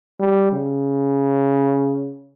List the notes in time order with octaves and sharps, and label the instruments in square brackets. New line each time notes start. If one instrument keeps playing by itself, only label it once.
[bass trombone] G3
C#3